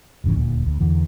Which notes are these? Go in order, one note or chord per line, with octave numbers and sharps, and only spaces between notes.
E1 G#2 C#3 E3
D#1 D2 A#2
D2
E2 D3 E3